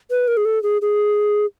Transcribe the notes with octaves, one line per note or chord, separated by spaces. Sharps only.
B4
A#4
G#4
A4
G#4
G#4